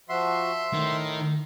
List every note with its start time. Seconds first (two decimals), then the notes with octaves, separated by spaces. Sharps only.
0.09 F3 F#4 E5 C6
0.74 A2 D#3